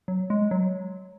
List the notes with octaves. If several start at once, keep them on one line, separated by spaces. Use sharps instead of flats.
F#3
G#3
F#3